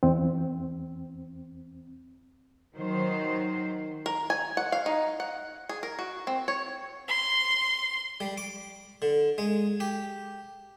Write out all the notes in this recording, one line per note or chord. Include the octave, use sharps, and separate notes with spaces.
E2 C4
D#3 F#3 C5
A#4
G#5
F#5
F5
D#4
F#5
G#4
A#4
F#4
C4
C#5
C6
G3
D6
D3
G#3
G4